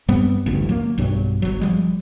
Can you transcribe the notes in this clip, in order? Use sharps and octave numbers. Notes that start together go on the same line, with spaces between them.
G2 G3 B3 C4
A1 D2 G2
F#3 A#3
B1 G2 F#3
G1 F#3
F3 G3 G#3